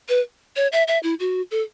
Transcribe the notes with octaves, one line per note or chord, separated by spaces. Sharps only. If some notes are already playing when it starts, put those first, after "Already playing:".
B4
C#5
E5
E5
E4
F#4
A4